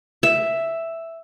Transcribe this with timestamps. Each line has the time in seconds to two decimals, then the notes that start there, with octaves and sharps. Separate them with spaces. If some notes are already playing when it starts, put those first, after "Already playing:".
0.23 E5